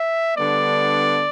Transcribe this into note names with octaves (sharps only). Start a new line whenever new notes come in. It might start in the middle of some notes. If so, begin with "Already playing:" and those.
Already playing: E5
D3 G3 B3 D4 D5